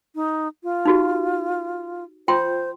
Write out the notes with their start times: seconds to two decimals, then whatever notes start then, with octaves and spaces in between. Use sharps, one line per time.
0.15 D#4
0.63 F4
0.85 D#4 F#4 G4
2.28 F4 C5 G5 C6